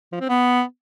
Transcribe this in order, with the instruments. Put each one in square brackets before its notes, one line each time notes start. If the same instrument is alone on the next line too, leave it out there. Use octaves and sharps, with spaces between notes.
[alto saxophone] F3
C4
B3